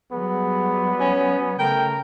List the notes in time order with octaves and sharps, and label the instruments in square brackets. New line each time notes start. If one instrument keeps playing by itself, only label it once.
[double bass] F#3 G3 [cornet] B3 [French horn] G#4
[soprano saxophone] C#4 [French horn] C#5
[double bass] C#3 [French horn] A3 [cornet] A#4 [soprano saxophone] G5